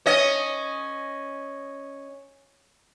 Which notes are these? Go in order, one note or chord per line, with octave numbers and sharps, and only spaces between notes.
C#4 D#5